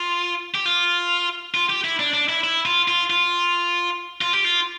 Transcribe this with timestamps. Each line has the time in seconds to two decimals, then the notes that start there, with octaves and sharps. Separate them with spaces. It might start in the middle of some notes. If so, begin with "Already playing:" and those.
Already playing: F4
0.55 G4
0.66 F4
1.55 F4
1.69 G4
1.85 E4
1.99 D4
2.14 D4
2.29 E4
2.44 E4
2.65 F4
2.88 F4
3.10 F4
4.21 F4
4.33 G4
4.45 F4